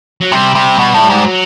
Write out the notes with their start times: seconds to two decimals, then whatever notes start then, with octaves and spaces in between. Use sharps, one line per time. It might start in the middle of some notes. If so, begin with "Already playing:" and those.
0.21 F#3
0.32 C3 G3
0.55 C3
0.79 B2
0.94 A2
1.10 G#2
1.24 F#3